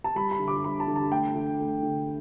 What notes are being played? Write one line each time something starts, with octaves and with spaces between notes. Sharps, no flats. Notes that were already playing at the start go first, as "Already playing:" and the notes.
A5
G3 B5
B5
D3
D6
G3 B5
A5
D3
A5
A3 G5
D3
A3
D3